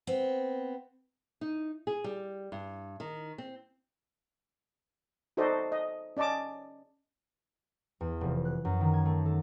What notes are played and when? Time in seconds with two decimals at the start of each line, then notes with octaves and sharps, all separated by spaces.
0.07 B3 C4
1.41 D#4
1.87 G#4
2.04 G3
2.52 G2
3.00 D#3
3.38 C4
5.37 D#4 F#4 A4 C5 D5 D#5
5.72 D#5
6.17 C#4 D5 D#5 A5 D6
8.01 E2
8.21 F1
8.45 F#6
8.65 F#2
8.81 D#3
8.93 G#6
9.05 A3
9.26 A4